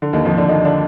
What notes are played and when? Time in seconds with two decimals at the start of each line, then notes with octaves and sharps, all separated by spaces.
0.02 D3
0.13 D#2 D#3
0.25 F2 F3
0.37 D3 D4
0.49 D#3 D#4
0.65 D3 D4